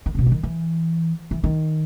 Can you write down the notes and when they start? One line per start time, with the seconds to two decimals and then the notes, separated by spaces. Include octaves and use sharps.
0.06 D#3
0.15 C#3
0.19 B2
0.26 E3
0.32 D#3
0.43 E3
1.31 E3
1.44 D#3